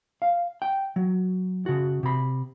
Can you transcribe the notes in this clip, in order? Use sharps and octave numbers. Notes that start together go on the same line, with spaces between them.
F5
G5
F#3
C#3 F#4
C3 B5